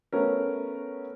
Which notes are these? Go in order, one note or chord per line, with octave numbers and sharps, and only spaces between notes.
A3 B3 C#4 A#4